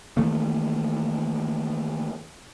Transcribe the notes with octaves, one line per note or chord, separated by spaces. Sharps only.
D#3 E3 A3 A#3